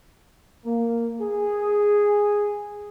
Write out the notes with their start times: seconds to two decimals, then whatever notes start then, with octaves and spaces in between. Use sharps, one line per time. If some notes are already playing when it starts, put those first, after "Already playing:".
0.65 A#3
1.19 G#4